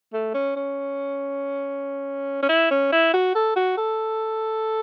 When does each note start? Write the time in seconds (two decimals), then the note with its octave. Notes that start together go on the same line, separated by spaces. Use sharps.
0.13 A3
0.34 C#4
0.56 C#4
2.42 C#4
2.49 E4
2.71 C#4
2.92 E4
3.14 F#4
3.35 A4
3.56 F#4
3.77 A4